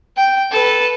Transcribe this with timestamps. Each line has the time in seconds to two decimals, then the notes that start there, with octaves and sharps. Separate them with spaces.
0.17 G5
0.51 A4 B4